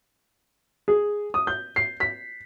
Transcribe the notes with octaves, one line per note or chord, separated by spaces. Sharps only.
G#4
D#6
G6
C7
B6